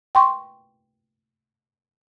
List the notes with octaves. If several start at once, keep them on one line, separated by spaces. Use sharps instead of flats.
G5 C6 C#6